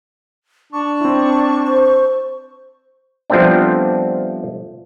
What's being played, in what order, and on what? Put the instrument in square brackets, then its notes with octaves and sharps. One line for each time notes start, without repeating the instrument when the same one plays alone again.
[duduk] D4 [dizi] C#6
[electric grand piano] C4 E4
[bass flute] C5
[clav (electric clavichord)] F3 G3 A3 B3 C4 D4